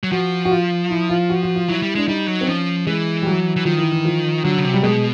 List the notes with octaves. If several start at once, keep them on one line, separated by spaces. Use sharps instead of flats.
F#3
F3 F#4
F#4
F4
E4
F4
F#4
F#4
F4
F#3 E4
G3
G#3 D4
G3 D#4
F#3
C4
F3 C#4
E3 G#3
G3
F#3
E3
D#3 F3
E3
E3
F3
D3 F#3
C#3
C3
G3
B2 G#3